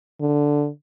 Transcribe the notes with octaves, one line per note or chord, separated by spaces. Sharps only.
D3